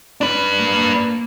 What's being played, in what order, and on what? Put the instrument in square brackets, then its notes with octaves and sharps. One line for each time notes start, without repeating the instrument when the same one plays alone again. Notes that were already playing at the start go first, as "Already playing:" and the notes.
[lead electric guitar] D4 B4
[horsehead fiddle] A#3